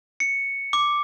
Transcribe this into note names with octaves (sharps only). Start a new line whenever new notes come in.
C#7
D6